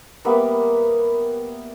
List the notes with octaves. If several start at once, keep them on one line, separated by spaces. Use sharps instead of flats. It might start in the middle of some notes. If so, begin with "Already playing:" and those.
G3 A#3 B3 E5